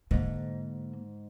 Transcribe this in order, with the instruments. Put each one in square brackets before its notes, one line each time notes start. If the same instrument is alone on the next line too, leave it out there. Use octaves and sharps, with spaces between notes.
[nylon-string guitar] G#2 [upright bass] D3 A#3